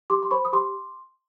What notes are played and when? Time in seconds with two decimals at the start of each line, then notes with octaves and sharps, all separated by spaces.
0.10 G4 C6 D6
0.23 C6
0.31 C5 B5 C#6
0.45 D#6
0.52 G4 C6 D6